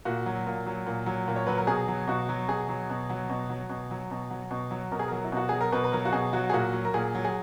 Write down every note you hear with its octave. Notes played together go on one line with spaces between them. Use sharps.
A#2 F#4
F#3
A#2
F#3
A#2
F#3
A#2
C#5
F#3 B4
A#4
B2 G#4
F#3
B2 F#4
F#3
B2 G#4
F#3
B2
F#3
B2
F#3
B2
F#3
B2
F#3
B2
F#3
B2 A#4
G#4
F#3 A#4
E4
B2 F#4
F#3 G#4
A#4
B2 B4
B4
F#3 A#4
F#4
B2 G#4
F#3 F#4
G#4
A#2 F#4
F#3
A#4
A#2 G#4
F#3
G#4